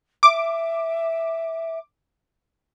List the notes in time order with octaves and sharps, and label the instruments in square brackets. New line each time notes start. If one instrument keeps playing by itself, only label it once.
[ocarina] E5 [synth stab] D6